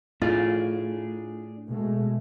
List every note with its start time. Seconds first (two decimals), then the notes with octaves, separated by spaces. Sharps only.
0.22 A2 D4 F4 G#4
1.67 B2 G#3 A3